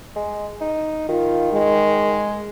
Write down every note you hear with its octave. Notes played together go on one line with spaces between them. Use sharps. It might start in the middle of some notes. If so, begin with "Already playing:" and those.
G#3
D#4
D#3 F4
G#3